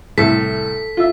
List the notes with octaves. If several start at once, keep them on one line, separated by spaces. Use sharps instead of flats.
C2 A2 A4 B6
F4 E5